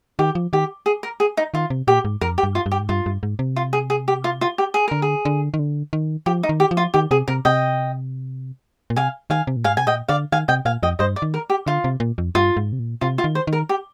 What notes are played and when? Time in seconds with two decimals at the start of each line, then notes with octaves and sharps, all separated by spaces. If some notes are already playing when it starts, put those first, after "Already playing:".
0.19 D#3 G4
0.35 F3
0.53 D#3 G4
0.86 G#4
1.03 A#4
1.20 G#4
1.37 D#4
1.54 D#3 F4
1.70 C3
1.87 A#2 G4
2.05 G#2
2.21 F2 A#4
2.38 G4
2.43 G2
2.55 F4
2.66 G2
2.71 G4
2.80 G#2
2.89 G2 F4
3.06 G2
3.23 G#2
3.39 C3
3.56 F4
3.73 G#4
3.90 G#4
4.08 G4
4.24 F4
4.41 F4
4.58 G4
4.74 G#4
4.88 D3 A#4
5.02 G#4
5.25 D3
5.54 D#3
5.59 D3
5.93 D#3
6.26 F3 G4
6.43 D#4
6.49 D#3
6.60 G4
6.71 F3
6.77 F4
6.94 D#3 G4
7.11 C3 G#4
7.28 C3 A#4
7.45 C3 D#5 G5
8.90 A#2
8.96 C3 F5 G#5
9.30 D#3 F5 G#5
9.47 C3
9.56 A#2
9.64 G#2 F5 G#5
9.77 C3 G#5
9.86 A#2 D#5 G5
10.08 D3 D5 F5
10.32 D#3 F5 G#5
10.48 C3 D#5 G5
10.65 A#2 F5 G#5
10.83 F2 D#5 G5
10.99 G2 C5 D#5
11.16 D5
11.22 D#3
11.34 A#4
11.50 G4
11.66 D3 F4
11.84 C3
12.00 A#2
12.18 F2
12.35 G2 F4
12.57 G#2
12.72 C3
12.79 A#2
13.01 C3 F4
13.18 F4
13.24 D#3
13.35 C5
13.47 D#3
13.53 A#4
13.69 G4